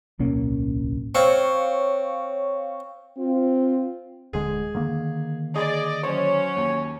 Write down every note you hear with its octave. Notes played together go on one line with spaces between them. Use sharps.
D1 B1 A#3 C#4
C4 C#5 F5 C#6
C4 F4
D#1 D3 G#3 G#4
D3 D#3 A#3
G#4 D5 D#5
F#3 C#4 C5 C#5
D#2